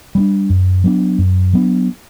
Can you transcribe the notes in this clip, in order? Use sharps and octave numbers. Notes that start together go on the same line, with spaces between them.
G3 B3 D4
F#2
F#3 B3 D4
F#2
F#3 B3 D4